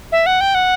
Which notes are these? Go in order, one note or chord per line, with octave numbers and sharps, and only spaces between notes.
E5
F#5
G5
F#5